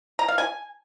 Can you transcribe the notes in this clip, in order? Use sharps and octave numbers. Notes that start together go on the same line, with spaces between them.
A#5
F5
G#5